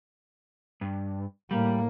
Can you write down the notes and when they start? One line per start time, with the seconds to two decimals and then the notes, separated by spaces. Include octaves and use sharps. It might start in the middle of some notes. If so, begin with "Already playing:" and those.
0.81 G2
1.51 A2 G3 A#3